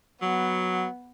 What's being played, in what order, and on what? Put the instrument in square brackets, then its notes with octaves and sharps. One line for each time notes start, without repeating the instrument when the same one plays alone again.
[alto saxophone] F#3 [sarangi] B3